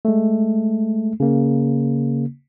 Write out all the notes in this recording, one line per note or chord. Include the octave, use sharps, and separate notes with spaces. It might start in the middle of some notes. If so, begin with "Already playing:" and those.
G#3 A3
C#3 A#3